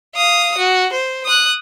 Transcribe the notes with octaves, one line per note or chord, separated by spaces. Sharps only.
F5 D#6
F#4
C5
D#6 F#6